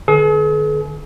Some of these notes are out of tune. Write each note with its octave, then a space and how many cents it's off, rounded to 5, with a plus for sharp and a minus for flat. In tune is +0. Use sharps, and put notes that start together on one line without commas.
D3 +35 G#4 +45 B4 -25